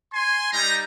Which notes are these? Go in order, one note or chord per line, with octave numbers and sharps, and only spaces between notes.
G#5 C6
G3 D#4 A#5